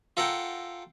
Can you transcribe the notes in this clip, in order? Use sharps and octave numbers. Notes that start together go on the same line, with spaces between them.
F4 A4 A#4 F#5 G5